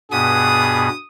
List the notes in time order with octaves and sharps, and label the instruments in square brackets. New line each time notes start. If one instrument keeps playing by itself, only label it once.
[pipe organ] G2 B2 B3 [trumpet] G#4 [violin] D#6